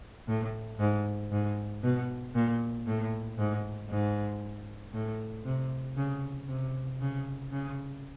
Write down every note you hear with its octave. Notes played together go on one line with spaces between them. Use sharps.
A2
G#2
G#2
B2
A#2
A2
G#2
G#2
A2
C3
C#3
C3
C#3
C#3